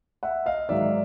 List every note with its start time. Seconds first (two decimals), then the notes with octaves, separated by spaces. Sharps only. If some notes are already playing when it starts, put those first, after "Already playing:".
0.23 E5 F#5
0.46 D#5 F5
0.69 G#2 D#3 F#3 D5 E5